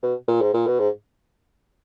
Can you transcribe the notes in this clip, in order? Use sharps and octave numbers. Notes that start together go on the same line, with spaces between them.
B2
A#2
G#2
A#2
B2
G#2